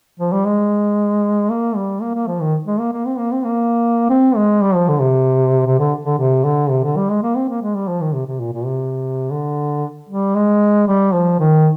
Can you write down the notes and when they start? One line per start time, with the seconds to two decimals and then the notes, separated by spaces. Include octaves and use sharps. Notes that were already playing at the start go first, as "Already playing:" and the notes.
0.20 F3
0.32 G3
0.45 G#3
1.50 A#3
1.76 G3
2.02 A#3
2.14 A#3
2.27 F3
2.41 D#3
2.67 G#3
2.80 A#3
2.93 A#3
3.06 C4
3.18 A#3
3.32 C4
3.45 A#3
4.09 C4
4.36 G#3
4.62 G3
4.75 F3
4.88 D3
5.01 C3
5.66 C3
5.79 D3
6.05 D3
6.18 C3
6.45 D3
6.70 C3
6.84 D3
6.97 G3
7.10 G#3
7.23 A#3
7.35 C4
7.49 A#3
7.62 G#3
7.75 G3
7.88 F3
8.01 D#3
8.14 C3
8.26 C3
8.40 A#2
8.53 A#2
8.66 C3
9.31 D3
10.09 G3
10.35 G#3
10.87 G3
11.13 F3
11.40 D#3